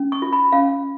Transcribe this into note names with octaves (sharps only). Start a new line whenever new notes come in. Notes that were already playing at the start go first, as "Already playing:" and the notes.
Already playing: C#4
C#6
F4
B5
C#4 F5